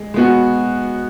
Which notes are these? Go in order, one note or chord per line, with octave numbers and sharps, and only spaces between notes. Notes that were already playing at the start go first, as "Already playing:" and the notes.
Already playing: G#3
G#3 B3 F#4